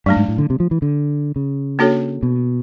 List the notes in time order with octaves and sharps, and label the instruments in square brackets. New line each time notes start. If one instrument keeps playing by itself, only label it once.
[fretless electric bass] G2 [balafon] F#3 A3 D4
[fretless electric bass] G#2
A2
D3
C3
F3
E3
D3
C#3
[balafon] A#3 D4 F#4 A4 C#5
[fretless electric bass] B2